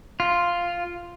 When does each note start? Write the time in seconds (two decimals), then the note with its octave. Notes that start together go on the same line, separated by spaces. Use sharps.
0.20 F4